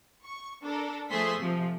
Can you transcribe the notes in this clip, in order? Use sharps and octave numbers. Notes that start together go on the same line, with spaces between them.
C#6
D4 A4 A#4
F3 A3 G#4 C5 C6 B6
C3 F3